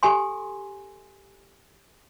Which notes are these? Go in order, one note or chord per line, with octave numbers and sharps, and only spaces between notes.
G4 A4 G#5 C6